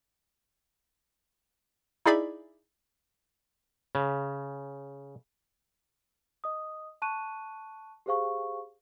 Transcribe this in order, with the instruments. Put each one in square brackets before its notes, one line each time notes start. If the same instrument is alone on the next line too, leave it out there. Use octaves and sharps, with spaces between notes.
[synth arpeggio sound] D#4 E4 G#4 D5 E5 B5
[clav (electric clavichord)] C#3
[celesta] D#5 D#6
A5 C#6 F#6 D#7
G4 G#4 C5 F5 C#6